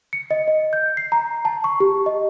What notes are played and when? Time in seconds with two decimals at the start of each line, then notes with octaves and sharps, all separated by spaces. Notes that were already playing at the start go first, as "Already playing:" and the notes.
0.13 C#7
0.31 D#5
0.48 D#5
0.73 G6
0.97 C7
1.12 A#5
1.45 A5
1.64 C#6
1.80 G4
2.06 D#5